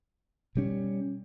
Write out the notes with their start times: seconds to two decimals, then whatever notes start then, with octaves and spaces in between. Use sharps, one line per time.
0.55 B2 G3 C#4